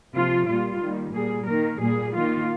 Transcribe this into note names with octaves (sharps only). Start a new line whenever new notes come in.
C3 F3 A#3 F4
A#2 G3 A#3 F4
D#3 G3 A#3
A#2 G3 A#3 G#4
D#3 A#3 A#4
A#2 G3 A#3 G#4
D#3 A#3 F4